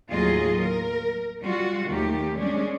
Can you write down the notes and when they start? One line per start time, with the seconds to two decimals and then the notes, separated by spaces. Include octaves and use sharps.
0.12 D#2 A2 F#3 F4 G#4 D#5
0.60 A#4
1.41 G3 F4 F#4
1.87 D#2 D#3 A3 G4
2.37 G#3 C#4 D4